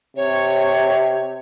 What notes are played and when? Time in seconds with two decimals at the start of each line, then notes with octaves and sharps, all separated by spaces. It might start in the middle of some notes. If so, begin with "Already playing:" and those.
0.17 C3 C#5